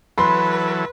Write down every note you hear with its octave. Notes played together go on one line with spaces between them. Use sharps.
E3 F#3 A4 B4 B5 C6